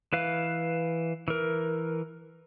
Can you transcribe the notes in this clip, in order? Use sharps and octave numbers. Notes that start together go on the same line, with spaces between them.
E3 B4 F5
E3 A#4